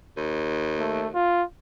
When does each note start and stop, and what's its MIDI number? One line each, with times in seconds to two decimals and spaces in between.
0.17 1.16 39
0.79 1.08 57
1.14 1.43 65